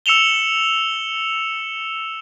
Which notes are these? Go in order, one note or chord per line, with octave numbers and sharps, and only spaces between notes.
E6 C#7 E7 F7 G7